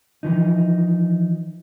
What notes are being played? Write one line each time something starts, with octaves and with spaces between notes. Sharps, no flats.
E3 F3 D#4